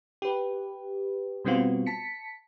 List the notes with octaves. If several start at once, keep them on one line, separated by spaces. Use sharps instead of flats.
G4 B4
B2 G3 B3 C4 F4 F#4
A5 B6 C#7